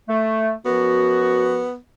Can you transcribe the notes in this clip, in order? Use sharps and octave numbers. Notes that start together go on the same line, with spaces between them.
A3
F#2 F3 B3 F#4